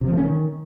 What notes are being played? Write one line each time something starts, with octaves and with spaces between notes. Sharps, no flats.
C3
F3
A3
C#4
D#3